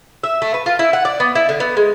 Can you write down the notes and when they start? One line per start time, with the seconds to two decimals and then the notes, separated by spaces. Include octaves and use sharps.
0.24 E5
0.42 A3
0.54 B4
0.66 F4
0.79 E4
0.93 F#5
1.05 D5
1.20 B3
1.35 E4
1.49 D3
1.60 B3
1.77 G#3